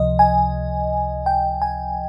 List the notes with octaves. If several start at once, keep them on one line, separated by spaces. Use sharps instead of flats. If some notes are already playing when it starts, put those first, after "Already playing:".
Already playing: C#2 C3 F3 D#5
G#5
G5
G#5